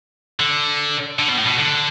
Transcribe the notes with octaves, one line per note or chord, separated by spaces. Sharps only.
D3
D3
B2
A2
B2
D3